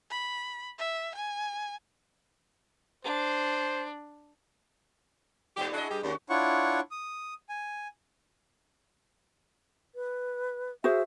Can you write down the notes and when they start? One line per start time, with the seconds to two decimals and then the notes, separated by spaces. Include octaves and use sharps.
0.11 B5
0.79 E5
1.15 G#5
3.05 D4 C5
5.57 G2 A#2 B3 G4
5.74 D4 E4 F#4 G#4 D#5
5.91 G2 G4
6.03 D#2 C#4 F#4
6.30 D4 E4 F4 C#5 F#5 C#6
6.91 D#6
7.49 G#5
9.95 B4
10.84 F#4 G#4 C5 E5